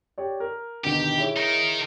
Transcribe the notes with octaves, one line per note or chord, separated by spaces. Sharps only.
G4 C#5 D5
A#4
D2 B2 D#3 G4
E4 G#4 C#5
D#4 A#4